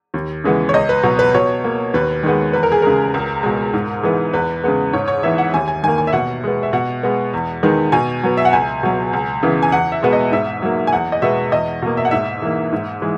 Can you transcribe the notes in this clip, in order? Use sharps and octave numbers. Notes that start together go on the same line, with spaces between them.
D#2
C#3 E3 G#3 B3
C#5
C#2 D#5
B4
B2 F#3
B4
B2 C#5
A#3
D#2 B4
D#3 G#3 B3
E2 B4
A#4
G#4
C#3 G#3 A#4
C#2
B2 G#3
G#2
E3 G#3 B3
E2 B4
C#3 G#3 B3
G#2 C#5
C#5
E3 B3 E5
F#5
D#2 G#5
G#5
D#3 A#3 G#5
G#5
E5
B2 F#5
G#3 B3
E5
B2 F#5
G#3 B3
E2
D#3 G#3 B3
B2 G#5
F#3 B3
E5
F#5
C#2 G#5
B2 F#3
C#2
C#3 E3 B3
G#5
E2 F#5
E5
B2 G#3 B3
D#5
G#2 E5
F#3 A#3
G#5
E2 F#5
D#5
B2 G#3 B3 E5
E2 D#5
B2 A#3
E5
F#5
G#2 E5
E3 A#3
G#2
E3 G#3